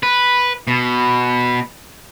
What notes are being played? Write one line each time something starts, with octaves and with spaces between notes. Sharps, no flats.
B4
B2